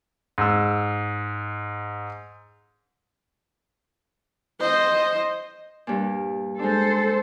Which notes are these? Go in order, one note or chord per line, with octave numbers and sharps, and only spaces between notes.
G#2 E6
C5 D#5
G2 A#2
G#3 D4 A4 C5